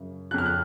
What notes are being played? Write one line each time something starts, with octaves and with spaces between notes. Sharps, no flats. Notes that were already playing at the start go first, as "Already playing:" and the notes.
Already playing: F#2 C#3
F2 C#3 F6 F#6
F#6